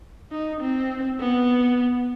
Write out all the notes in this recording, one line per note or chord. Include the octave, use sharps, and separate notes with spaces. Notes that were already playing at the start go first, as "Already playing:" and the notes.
D#4
C4
B3